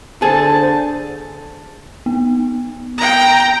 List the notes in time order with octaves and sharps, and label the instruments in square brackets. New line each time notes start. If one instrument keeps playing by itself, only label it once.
[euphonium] D3 [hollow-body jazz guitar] G#4 A4 [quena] C5 [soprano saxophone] A5
[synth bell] B3
[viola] G5 A#5